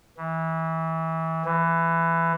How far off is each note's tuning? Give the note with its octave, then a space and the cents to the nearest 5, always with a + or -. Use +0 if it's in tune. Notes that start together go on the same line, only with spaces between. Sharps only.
E3 -25
E3 +15